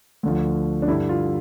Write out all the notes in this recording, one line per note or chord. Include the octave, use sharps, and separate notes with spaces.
D2 D3 F3
D4
G2 D3 G3 E4
F4